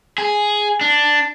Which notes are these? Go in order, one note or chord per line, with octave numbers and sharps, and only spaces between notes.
G#4
D4